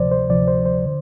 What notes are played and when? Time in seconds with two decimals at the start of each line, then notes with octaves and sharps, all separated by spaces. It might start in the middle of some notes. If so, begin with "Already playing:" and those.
Already playing: D2 C3 F3 C5 D5
0.11 C5
0.30 D2 C3 F3 D5
0.48 C5
0.66 C5
0.86 D3